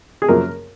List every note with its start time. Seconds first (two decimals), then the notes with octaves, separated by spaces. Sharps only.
0.22 G#4
0.28 F#2 F3 A#3 A#4